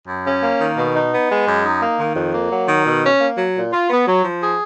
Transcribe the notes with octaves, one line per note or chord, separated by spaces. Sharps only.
F#2
C#4
A#3
D#3
B2
D#4
B3
G#3
F#2
D#4
A#3
D#3
F2
A#3
F#3
D#3
B2
C#4
A#3
F#3
A#2
F4
B3
F#3
F3
G#4